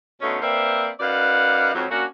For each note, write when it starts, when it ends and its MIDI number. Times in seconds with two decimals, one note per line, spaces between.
0.22 0.39 47
0.22 0.39 50
0.22 0.39 57
0.22 0.39 61
0.22 0.39 63
0.42 0.89 58
0.42 0.89 60
0.42 0.89 71
0.42 0.89 72
0.42 0.89 74
0.42 0.89 76
1.00 1.73 42
1.00 1.73 63
1.00 1.73 71
1.00 1.73 74
1.00 1.73 77
1.00 1.73 78
1.74 1.85 41
1.74 1.85 44
1.74 1.85 54
1.90 2.04 58
1.90 2.04 61
1.90 2.04 62
1.90 2.04 66